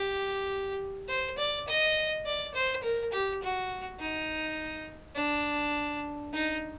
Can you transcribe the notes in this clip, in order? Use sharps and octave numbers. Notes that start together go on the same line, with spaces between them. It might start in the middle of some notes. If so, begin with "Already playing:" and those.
Already playing: G4
C5
D5
D#5
D5
C5
A#4
G4
F#4
D#4
D4
D#4